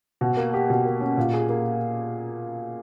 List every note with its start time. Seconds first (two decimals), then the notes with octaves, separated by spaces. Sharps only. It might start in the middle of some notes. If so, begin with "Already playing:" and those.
0.21 B2
0.37 A#3
0.54 G4
0.70 B2
0.85 A#3
1.01 C#4
1.17 A#2
1.33 G#4
1.49 A#3